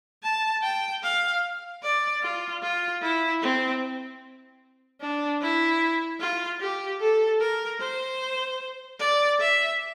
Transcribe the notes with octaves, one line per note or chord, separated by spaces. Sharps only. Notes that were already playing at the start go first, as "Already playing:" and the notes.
A5
G5
F5
D5
F4
F4
E4
C4
D4
E4
F4
G4
A4
A#4
C5
D5
E5